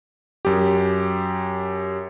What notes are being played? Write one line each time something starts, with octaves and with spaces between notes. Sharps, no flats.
F#2 G4